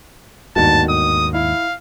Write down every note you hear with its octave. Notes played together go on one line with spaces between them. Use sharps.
G1 D#2 G#2 D#3 F#4 A5
D#6
E4 F5